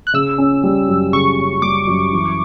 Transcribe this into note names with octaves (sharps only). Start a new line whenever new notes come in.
F#6
C#3 E6
C#4
G3
F#2
C#3 C#6
C#4
G3 D6
F#2
E3